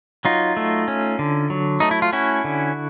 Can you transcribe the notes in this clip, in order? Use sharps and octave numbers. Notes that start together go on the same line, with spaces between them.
F#3 D#4 F4
A3
C#4
D3
F#3
A3 D#4
E4
F4
C#4 E4 F#4
D3